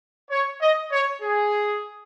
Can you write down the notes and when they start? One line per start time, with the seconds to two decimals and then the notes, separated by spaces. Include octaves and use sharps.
0.30 C#5
0.60 D#5
0.92 C#5
1.22 G#4